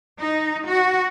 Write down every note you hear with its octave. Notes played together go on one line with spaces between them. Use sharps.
D#4
F#4